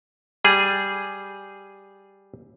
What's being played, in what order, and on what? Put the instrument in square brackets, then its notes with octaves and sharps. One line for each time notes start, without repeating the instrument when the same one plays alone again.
[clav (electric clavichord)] G3 G#4